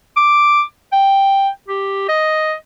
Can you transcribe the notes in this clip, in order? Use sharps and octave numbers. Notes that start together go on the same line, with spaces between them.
D6
G5
G4
D#5